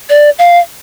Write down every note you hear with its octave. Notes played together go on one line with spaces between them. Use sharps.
D5
F5